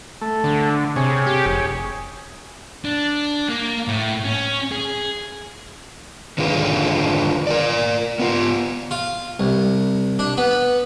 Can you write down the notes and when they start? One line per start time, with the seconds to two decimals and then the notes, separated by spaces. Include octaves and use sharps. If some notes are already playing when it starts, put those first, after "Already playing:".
0.21 A3
0.44 D3
0.96 C3 G#4 C#5
1.27 G4
1.46 F1
2.85 D4
3.49 A#3
3.88 A2
4.24 C#4
4.72 G#4
6.38 D3 D#3 F4 G#4 B4
7.47 A#4 D5
8.19 B3 F4
8.91 F4
9.40 C2
10.19 D4
10.37 B3